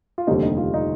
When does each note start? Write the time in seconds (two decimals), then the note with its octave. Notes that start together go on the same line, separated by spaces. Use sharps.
0.18 F4
0.27 F1 D#2 D3 G3 C4 D#4
0.42 D#4
0.57 F4
0.74 D#4